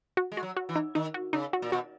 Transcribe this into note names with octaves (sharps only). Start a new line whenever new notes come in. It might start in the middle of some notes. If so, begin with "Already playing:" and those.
F#4
G#3
F#4
F#3
F#4
E3
D#4
D#3 D#4
F#4
C#3 D#4
F#4
A#2
B2 F#4